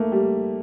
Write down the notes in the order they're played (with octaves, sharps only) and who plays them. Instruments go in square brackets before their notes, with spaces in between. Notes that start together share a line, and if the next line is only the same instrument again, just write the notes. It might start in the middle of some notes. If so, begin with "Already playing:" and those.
Already playing: [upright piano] A3 A#3
G3